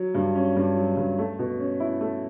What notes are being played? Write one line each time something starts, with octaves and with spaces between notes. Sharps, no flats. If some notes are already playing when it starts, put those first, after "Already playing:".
Already playing: F#3
G2
C#4
G2
F#3
G2
A3
B2
C#4
E4
A3